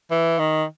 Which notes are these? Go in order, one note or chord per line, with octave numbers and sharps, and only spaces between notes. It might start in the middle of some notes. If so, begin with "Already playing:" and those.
E3
D#3